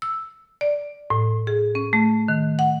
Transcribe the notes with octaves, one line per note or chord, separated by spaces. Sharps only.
E6
D5
A2
G#4
C#4
A3
D#3
F#5